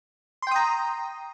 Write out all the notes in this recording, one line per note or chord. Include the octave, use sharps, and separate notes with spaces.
G5 A#5 C6 D#6